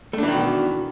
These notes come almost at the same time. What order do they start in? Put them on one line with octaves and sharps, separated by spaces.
A3 D4 E3 D#3 B2